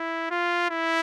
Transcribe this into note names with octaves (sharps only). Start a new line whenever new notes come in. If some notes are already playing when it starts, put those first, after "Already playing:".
Already playing: E4
F4
E4